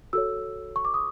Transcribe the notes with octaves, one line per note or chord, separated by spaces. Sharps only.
F#4 A4 C#5 E6
C#6
D6
D#6